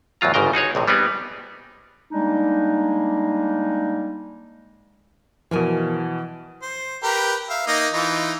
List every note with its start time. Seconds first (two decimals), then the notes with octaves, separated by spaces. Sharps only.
0.21 E2 A2 F#3 F4 A#5
0.34 G1 G#2 C#3 A#4 G5
0.53 D#4 F#4 G#4 C#5
0.75 A#1 A2 C3
0.88 G3 B3 C4 D#4 G#4
2.11 G3 G#3 A#3 D4 D#4
5.51 B2 E3 F3 A#4 G#5
6.62 C5
7.03 G4 A#4 B4
7.49 E5 F5
7.67 A#3 D#4 D#5
7.93 E3 D#4 F4